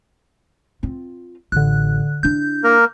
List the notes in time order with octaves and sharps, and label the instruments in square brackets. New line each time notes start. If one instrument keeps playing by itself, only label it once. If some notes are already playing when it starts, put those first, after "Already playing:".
[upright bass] C4 F4
[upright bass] A1 [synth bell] D3 F#6
[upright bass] D4 E4 [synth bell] G6
[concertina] A#3 A#4